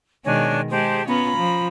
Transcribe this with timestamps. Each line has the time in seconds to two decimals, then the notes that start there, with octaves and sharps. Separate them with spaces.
0.24 B2 D#3 G#3 D4 C#5 G#5
0.70 G#3 G4 G#4 C5 A5
1.07 B3 C#4 F4 A#5 B5
1.37 F3